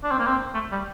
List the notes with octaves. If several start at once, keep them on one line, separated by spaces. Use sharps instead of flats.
D4
C4
A#3
C4
A3
G3